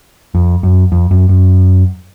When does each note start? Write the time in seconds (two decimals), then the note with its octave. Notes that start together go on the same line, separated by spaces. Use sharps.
0.35 F2
0.63 F#2
0.92 F2
1.11 F#2
1.29 F#2